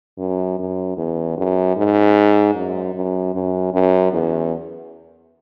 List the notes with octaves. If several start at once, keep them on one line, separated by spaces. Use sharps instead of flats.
F#2
F#2
E2
F#2
G#2
F#2
F#2
F#2
F#2
E2